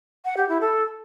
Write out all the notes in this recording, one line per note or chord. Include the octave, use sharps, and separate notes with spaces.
F#5
G4
E4
A4